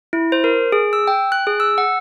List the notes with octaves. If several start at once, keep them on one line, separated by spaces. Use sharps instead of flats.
E4
C5
A#4
G#4
E6
G5
F#6
G#4
E6
F#5